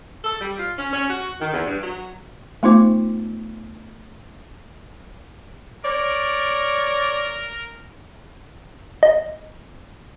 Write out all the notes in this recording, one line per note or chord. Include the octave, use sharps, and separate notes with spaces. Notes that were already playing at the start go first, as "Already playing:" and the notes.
A4
G3
F4
C#4
C#4
F#4
D#3
E2
G2
F#3
A3 B3 D#4 F4 C5 D6
A#4 C#5 D5
D#5